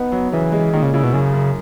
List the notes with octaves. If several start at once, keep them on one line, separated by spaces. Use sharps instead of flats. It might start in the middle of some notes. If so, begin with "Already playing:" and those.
Already playing: B3 D#4
F#3
C#3 E3
G#3
A#2 D#3
C#3
C#3 E4
B2
F#2 C#3
F#2